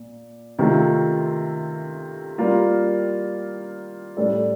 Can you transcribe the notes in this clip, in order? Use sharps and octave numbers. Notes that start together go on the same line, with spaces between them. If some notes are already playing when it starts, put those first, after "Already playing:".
Already playing: A#2
C3 D#3 A3 C4 F4
G3 A#3 F4 A#4
A2 G3 D4 A4